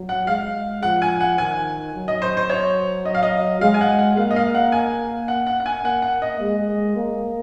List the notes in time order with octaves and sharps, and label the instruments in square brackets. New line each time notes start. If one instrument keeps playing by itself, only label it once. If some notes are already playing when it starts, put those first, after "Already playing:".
Already playing: [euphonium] F#3
[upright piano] F#5
[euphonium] G#3 [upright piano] F5
[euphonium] F3 [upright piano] F#5
[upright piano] G#5
F#5
[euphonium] D#3 [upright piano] G#5
[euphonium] F#3
[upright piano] D#5
C5
C5
C#5
D#5
F5
D#5
[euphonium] G#3 [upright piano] F5
[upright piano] G#5
F#5
F#5
[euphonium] A#3 [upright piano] F5
[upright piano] D#5
F5
F#5
G#5
F#5
F#5
F#5
G#5
[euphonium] A#3 [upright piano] F#5
[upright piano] F#5
D#5
[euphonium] G#3
A#3